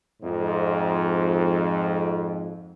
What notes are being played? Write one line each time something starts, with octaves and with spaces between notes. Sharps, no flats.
F2 G#2